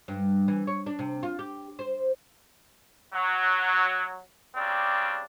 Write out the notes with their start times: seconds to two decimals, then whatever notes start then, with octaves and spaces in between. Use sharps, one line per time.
0.08 G2
0.48 E3
0.67 C#5
0.86 D4
0.99 C3
1.23 F4
1.39 G4
1.79 C5
3.13 F#3
4.55 C#3 G3 C4 D4